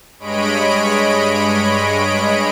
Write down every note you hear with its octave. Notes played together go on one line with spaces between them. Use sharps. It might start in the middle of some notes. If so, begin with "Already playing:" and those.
G2 G#3 C#5 D#5 B5 D7